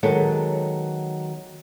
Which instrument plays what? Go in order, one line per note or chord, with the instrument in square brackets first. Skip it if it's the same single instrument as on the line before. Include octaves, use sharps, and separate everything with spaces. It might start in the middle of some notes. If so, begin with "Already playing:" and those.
[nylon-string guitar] D#3 F#3 G#3 B3 A4 C#5